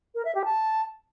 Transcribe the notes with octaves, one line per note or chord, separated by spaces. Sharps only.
A#4
E5
G4
A5